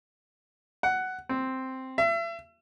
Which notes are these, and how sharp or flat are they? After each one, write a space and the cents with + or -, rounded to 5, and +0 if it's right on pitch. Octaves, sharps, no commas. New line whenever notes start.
F#5 +10
C4 +0
E5 +35